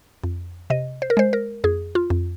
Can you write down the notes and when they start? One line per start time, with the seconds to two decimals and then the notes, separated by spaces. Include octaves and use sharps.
0.24 F2
0.70 C3 D#5
1.02 C5
1.10 A#4
1.17 G#3 C5
1.33 A#4
1.64 F2 G#4
1.95 F4
2.10 F2